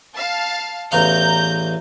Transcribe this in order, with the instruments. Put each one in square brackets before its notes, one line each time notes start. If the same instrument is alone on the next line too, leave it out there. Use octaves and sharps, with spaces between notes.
[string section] F5 A5
[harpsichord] A1 E2 F5 [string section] A#5 G6